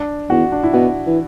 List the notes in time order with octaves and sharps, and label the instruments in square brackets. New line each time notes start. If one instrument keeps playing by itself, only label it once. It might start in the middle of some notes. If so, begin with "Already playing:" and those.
Already playing: [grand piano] D4
[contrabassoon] E2 [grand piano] F#4
[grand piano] D4
E4
[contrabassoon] B2 [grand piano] F#4
[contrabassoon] E3